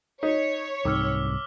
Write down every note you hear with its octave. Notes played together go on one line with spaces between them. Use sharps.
D#4 C#5 B6
C2 G#2 C3 D#3 D6 E6 F6